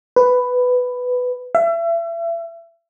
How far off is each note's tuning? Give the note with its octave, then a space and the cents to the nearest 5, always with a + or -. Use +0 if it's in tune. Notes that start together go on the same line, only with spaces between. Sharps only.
B4 +10
E5 +35